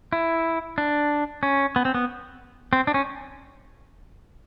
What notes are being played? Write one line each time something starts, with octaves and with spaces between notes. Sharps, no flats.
E4
D4
C#4
B3
C4
B3
C4
D4
C#4